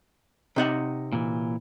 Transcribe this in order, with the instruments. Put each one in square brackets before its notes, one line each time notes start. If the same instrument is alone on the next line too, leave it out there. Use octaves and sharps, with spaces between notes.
[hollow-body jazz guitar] C3 D#4 F#5
[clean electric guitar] A#2 E3